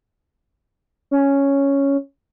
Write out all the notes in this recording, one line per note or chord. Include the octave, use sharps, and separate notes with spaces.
C#4